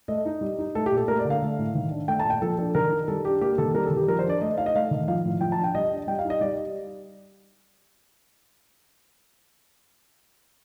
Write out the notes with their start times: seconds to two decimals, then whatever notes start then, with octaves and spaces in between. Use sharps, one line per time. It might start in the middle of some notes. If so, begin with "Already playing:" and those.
0.08 A3 D#5
0.25 D#4
0.41 G3
0.59 D#4
0.75 A3 A4
0.86 G4
0.92 A#2
0.97 A4
1.08 A3 A#4
1.19 D5
1.25 D3
1.30 F5
1.42 A3
1.58 A2
1.75 D#3
1.91 D4
2.08 A3 G5
2.19 A5
2.24 A#2
2.30 G5
2.42 F3 A4
2.59 D4 A4
2.75 D#3 A#4
2.91 D#4
3.08 G3 A4
3.24 D4 G4
3.41 A#3 G4
3.58 D#3 A4
3.74 G3 A#4
3.86 A4
3.91 D#3
3.97 G4
4.08 F3 A#4
4.19 C5
4.25 D4 D5
4.41 A3 D#5
4.58 D#4 F5
4.66 D#5
4.74 A3 F5
4.91 D#3
5.08 F3 F5
5.24 A2
5.41 F3 G5
5.52 A5
5.58 D4
5.64 G5
5.75 G3 D#5
5.91 D4
6.07 G3 G5
6.19 F5
6.25 D#4
6.30 D#5
6.41 G3 D5